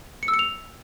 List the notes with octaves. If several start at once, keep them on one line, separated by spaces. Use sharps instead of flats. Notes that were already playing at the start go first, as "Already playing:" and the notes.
C#7
E6
C#7
F7